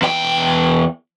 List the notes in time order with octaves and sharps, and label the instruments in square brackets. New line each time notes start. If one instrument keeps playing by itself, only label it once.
[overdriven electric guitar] E2 G5